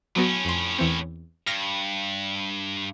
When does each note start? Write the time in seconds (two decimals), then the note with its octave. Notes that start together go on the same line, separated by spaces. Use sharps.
0.16 A2 F#3 B3 C#4 F#4
0.45 F2 C6
0.78 E2 E3 C4
1.47 G2 F6 A#6